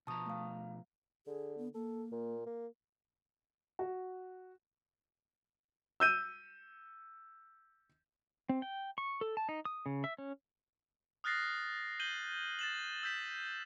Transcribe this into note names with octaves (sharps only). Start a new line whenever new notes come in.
B2 F3 A5 A#5 C#6 D#6
A3 F5
D3 G#4
B3
A#3 A4
A#2
A#3
F#4
E6 G6 D#7
C4
G5
C#6
A4
A5
D#4
D#6
C#3
E5
C#4
D#6 F6 F#6 A6 A#6 C7
G6 D#7 F#7 G7
A6 E7 F#7
E6 G6 B6 E7